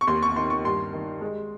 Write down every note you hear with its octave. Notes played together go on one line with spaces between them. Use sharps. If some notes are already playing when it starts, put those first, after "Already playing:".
C#6
D#2 C6
C#6
D#3 C6
C#6
G2 C6
D#3
G#3